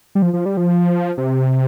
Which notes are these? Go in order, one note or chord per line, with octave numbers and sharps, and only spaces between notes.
G3
F3
F3
G3
F3
C3